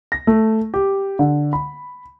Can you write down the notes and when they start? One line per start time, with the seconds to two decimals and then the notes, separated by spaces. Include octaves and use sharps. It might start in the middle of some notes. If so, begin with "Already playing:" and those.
0.12 A#6
0.27 A3
0.74 G4
1.19 D3
1.53 B5